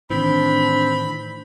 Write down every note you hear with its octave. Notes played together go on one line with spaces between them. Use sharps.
A2 D#3 E3 C4 D4 B5